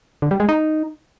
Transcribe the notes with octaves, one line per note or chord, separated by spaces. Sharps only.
D3
G3
G#3
D#4